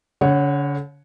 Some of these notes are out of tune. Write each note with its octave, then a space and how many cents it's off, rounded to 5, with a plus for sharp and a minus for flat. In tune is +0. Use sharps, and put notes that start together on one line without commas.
D3 -45 C#5 +0 F#5 +0